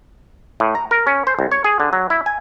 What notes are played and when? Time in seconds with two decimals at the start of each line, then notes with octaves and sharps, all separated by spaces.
0.60 A2
0.75 A#5
0.91 A#4
1.07 C#4
1.27 C5
1.39 C2
1.51 C#5
1.64 G#4
1.80 D3
1.93 F#3
2.10 E4
2.26 G#5